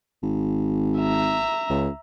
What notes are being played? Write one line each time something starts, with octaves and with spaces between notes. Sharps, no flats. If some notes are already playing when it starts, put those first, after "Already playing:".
G#1
E5 A#5
C#2